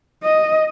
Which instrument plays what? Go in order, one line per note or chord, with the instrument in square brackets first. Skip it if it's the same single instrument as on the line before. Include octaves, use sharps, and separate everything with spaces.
[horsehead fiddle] D#5